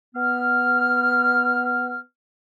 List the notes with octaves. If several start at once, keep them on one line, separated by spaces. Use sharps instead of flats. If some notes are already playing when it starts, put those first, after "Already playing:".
B3 F6